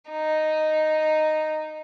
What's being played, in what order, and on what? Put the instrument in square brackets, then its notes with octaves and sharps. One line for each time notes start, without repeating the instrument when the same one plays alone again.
[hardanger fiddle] D#4